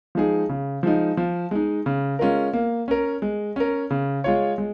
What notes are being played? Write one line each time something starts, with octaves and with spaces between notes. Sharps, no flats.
F3 G#3 D#4 G#4
C#3
F3 G#3 D#4
F3
G#3 D#4
C#3
G#3 C#4 F4 A#4
A#3
C#4 A#4
G#3
C#4 A#4
C#3
G#3 F4 C#5
G#3